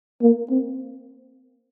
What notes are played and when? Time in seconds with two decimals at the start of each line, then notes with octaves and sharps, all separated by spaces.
0.22 A#3
0.50 C4